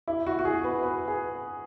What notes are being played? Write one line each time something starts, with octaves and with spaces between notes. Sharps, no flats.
E4
F#4
F#4
G#4
B4
B4
G#4